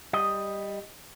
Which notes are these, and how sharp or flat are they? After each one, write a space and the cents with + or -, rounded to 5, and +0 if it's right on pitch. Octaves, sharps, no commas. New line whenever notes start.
G3 +10 D#5 +0